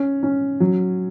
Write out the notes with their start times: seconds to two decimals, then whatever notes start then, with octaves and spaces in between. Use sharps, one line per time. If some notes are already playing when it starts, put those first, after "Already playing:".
Already playing: C#4
0.23 C#4
0.60 F#3